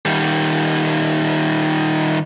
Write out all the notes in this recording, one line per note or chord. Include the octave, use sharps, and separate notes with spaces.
D#3 G3